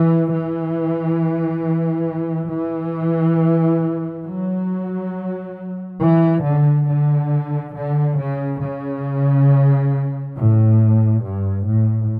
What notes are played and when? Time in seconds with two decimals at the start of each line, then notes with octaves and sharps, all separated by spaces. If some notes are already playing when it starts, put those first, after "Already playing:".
Already playing: E3
0.32 E3
2.50 E3
4.24 F#3
6.00 E3
6.43 D3
6.87 D3
7.75 D3
8.19 C#3
8.61 C#3
10.36 A2
11.24 G2
11.67 A2